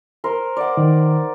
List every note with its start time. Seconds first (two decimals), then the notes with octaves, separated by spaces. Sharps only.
0.24 A#4 C5
0.57 D5 F#5
0.77 D#3